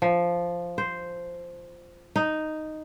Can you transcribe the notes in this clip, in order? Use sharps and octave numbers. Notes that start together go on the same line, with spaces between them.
F3
C5
D#4